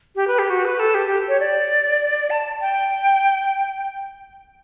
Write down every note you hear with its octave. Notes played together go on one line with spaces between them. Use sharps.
G4
B4
G4
F#4
B4
A4
G4
G4
C#5
D5
A5
G5